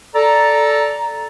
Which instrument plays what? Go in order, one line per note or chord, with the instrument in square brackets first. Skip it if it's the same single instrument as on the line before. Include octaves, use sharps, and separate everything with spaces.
[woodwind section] A4 D5 A#5